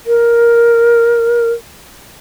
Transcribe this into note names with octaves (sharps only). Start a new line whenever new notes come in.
A#4